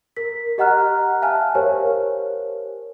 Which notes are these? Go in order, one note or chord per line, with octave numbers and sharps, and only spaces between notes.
A#4 B6
G4 D#5 F#5 A#5 F6 F#6
E5 F5 G#5 A5 F6
G4 A#4 C5 C#5 G#5